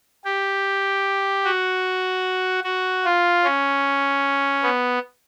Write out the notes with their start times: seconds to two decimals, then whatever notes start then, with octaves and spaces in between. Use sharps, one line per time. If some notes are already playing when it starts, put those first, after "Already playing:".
0.25 G4
1.45 F#4
2.64 F#4
3.05 F4
3.44 C#4
4.63 B3